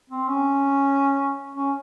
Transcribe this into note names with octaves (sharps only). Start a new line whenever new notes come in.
C4
C#4
C#4